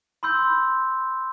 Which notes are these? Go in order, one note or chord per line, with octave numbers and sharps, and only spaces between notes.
B5 C6 E6 G6